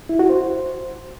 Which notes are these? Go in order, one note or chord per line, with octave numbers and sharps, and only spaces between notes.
E4
F#4
C5